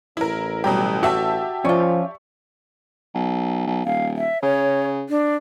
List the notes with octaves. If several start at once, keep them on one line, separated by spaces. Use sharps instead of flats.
A1 E4 A#4
B2 F#3 G3 G4 A#5
F#4 G4 E5 A5 E6
F3 C#4 F4 D5 C#6
B1
B1
D#1 F5
E5
C#3 C#5
D4